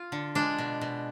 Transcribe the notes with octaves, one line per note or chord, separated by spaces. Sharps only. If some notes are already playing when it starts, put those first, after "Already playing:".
Already playing: F4
D3
G#3 D4
B2
B2